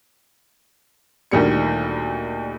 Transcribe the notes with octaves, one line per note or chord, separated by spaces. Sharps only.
D2 A#2 D#3 G3 C#7